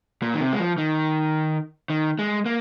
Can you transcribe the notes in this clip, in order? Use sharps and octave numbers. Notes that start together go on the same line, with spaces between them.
A#2
D#3
C3
G#3
F3
D#3
D#3
G#3
A#3